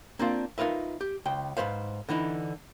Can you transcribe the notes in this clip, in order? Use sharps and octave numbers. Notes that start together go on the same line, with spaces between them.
A#3 C4 D4 F4
D#4 F4 A#4 B4 E5
G4
C#2 G5
G#2 C#3 B4 C5 F5
D3 E3 D#4 E4